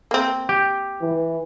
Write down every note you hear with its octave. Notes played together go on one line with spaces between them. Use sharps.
A#3 C4
G4
E3